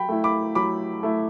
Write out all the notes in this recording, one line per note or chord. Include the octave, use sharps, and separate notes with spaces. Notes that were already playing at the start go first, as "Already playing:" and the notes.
Already playing: F#3 G5 B5
A3 E4
B5 D6
F#3 B5 D6
A3 E4